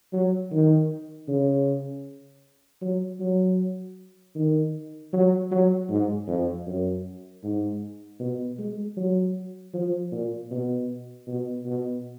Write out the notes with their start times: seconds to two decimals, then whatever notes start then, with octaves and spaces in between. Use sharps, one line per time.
0.13 F#3
0.52 D#3
1.28 C#3
2.81 F#3
3.20 F#3
4.35 D#3
5.13 F#3
5.51 F#3
5.89 G#2
6.28 F2
6.67 F#2
7.43 G#2
8.19 B2
8.59 G#3
8.97 F#3
9.74 F3
10.12 A#2
10.51 B2
11.27 B2
11.66 B2